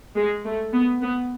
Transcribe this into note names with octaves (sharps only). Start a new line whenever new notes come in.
G#3
A3
B3
B3